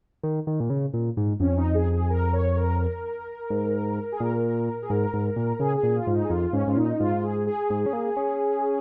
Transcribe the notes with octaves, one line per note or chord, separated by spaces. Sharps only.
D#3
D#3
A#2
C#3
A#2
G#2
F2 C#4
D#4
G#4
G#4
A#4
C#5
A#4
G#2
G#4
A#2 A#4
G#4
G#2 A#4
G#2
A#2
C#3 G#4
G#4
A#2
F4
G#2
D#4
G#4
F2 F4
G#2 C#4
G#2 F4
A#2 D#4
G#2 F4
G#4
G#4
G#2
C#4
A#3
C#4